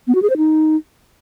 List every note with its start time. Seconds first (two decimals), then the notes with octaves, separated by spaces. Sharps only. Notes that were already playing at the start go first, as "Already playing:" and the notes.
0.08 B3
0.15 F#4
0.22 G#4
0.30 C5
0.37 D#4